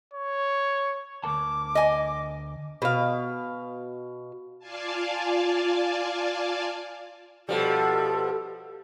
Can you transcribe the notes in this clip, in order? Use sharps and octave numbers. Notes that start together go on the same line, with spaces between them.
C#5
D2 A#4 A5 D6
D#5 G#5
B2 F5
F4 D5 F5 G#5 A5
B2 F3 G3 A4